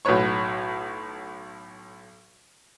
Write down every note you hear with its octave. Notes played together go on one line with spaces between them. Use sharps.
B1 A2 F#3 B4 C#5 C#6